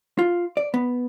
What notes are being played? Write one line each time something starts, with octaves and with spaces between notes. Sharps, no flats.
F4
D5
B3